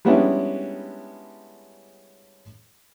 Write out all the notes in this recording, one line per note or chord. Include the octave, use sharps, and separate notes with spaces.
G3 G#3 B3 C#4 D4 E4